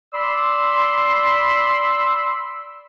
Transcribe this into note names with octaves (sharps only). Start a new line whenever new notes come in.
D5 B5 C6 E6